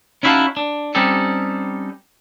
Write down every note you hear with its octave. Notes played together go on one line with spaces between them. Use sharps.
C#4 D#4 E4 F#4 F5 A5
D4
G3 C4 C#4 D#4 G4 A4